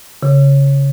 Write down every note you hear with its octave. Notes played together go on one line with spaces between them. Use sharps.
C#3